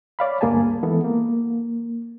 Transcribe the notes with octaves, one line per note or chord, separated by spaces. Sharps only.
C#5 D5 F5 B5
D2 G2 A#3 G#4 G#5 A5
E3 G#3 B3 A4
A#3